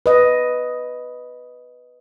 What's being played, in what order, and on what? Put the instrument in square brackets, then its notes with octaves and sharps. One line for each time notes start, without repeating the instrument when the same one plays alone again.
[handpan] B4 D#5